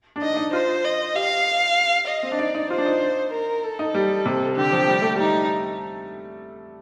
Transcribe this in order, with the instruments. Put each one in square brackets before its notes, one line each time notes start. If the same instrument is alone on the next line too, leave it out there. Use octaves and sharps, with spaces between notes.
[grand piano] D4
[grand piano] D#4 [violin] D#5
[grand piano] D4
D#4
[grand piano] F4 [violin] C5
[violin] D#5
[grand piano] G4 [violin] F5
[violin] D#5
[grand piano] C4
D4
[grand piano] D#4 [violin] D5
[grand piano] D#4
[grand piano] F4 [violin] C5
[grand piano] D4
D#4
[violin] A#4
A4
[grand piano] D#4
G3
C3
[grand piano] D3 [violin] G4
[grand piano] F3
G3
A3
[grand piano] G3 [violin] D#4